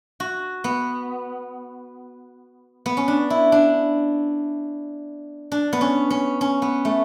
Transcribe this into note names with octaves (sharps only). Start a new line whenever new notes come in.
F#4
B3
B3
C#4
D4
E4
D4
D4
B3
C#4
C#4
C#4
B3
A3